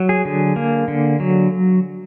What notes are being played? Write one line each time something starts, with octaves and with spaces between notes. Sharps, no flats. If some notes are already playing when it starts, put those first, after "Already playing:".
Already playing: F#3
G#4
D3
A#3
D3
F#3